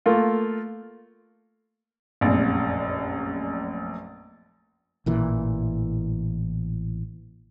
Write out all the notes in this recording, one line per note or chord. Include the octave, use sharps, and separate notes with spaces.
A3 A#3 F4
F1 A#1 F#2
A1 A#2 E3